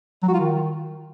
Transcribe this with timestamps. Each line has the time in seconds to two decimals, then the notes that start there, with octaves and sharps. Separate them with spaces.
0.23 F#3
0.28 F#4
0.34 F4
0.39 D#3